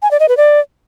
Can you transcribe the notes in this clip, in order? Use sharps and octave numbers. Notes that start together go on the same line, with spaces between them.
G#5
D5
D#5
B4
D5